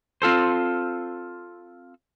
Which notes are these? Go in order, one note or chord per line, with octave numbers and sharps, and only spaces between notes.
C4 F4 A4 C5